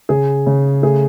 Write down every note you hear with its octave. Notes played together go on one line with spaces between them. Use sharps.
C#3 G#4
C#3
A3 G#4